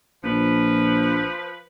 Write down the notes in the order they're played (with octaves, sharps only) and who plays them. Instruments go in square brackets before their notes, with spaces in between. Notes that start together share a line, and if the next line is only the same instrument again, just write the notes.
[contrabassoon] A#1 [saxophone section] F3 B4